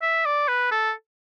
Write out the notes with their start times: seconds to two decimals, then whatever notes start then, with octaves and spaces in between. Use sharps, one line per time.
0.02 E5
0.25 D5
0.48 B4
0.71 A4